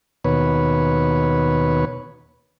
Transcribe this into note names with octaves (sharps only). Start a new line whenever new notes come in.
D#2 B2 B4 C#5